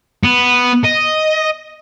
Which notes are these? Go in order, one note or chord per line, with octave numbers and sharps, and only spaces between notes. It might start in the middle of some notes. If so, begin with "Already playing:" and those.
B3
D#5